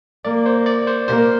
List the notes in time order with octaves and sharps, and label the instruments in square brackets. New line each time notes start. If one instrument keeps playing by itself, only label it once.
[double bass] A#3 [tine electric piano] D5
[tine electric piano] C5
D5
C5
[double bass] A#3 [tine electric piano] C5